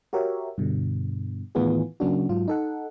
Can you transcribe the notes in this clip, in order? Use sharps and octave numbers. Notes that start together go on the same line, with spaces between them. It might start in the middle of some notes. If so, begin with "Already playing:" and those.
F#4 G4 A#4 C#5 E5
G2 B2 D3
A2 D#3 E3 B3 F4 G#4
C#3 F#3 A#3 C#4 D4 F#4
G#2 F#3 F4
D#4 A4 F#5